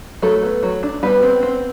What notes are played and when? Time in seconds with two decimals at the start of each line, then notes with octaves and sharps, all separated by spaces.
0.22 F#3 A3 A4
0.43 B3
0.63 F#3
0.83 D4
1.03 G3 B3 B4
1.23 C4
1.43 C4